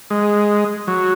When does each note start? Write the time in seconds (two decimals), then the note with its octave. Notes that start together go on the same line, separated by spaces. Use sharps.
0.10 G#3
0.87 F#3